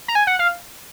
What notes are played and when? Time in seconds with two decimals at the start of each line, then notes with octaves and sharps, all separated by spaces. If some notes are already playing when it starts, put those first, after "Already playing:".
0.08 A#5
0.15 G#5
0.27 F#5
0.39 F5